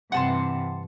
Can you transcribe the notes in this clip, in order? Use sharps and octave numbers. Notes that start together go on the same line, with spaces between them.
G2 C3 E3 F#5 A5 C6